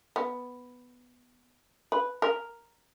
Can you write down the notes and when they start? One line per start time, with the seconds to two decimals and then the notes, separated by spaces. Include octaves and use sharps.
0.16 B3
1.92 B4
2.22 A#4